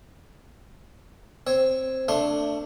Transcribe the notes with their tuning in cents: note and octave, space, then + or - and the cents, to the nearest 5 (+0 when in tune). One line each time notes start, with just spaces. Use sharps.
C4 +0 C#5 +0
A3 +25 D4 +0 C6 +25